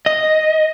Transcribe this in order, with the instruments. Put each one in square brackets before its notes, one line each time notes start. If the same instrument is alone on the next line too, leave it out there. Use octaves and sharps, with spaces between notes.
[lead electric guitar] D#5